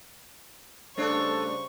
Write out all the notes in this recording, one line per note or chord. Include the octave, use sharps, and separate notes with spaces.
C#3 G3 A3 D4 A4 C5 C#5 C#6